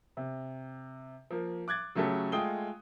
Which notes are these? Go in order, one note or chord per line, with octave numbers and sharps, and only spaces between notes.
C3
F3 A#3
D6 F#6 G#6 A6
C#3 F#3 A3 G4 A4 C#5
G#3 A3 F4 G5 D#6 G7